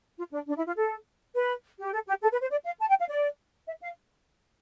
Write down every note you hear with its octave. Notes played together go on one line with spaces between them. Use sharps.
F4
D4
D4
E4
F4
A4
B4
G4
A4
G4
A4
B4
C5
D5
F5
A5
G5
F5
D5
E5
F5